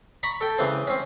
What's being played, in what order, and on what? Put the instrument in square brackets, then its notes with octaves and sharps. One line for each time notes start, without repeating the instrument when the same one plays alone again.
[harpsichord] A#5 B5 C#6
A4 G5
C#3 E3 C4
C4 C#4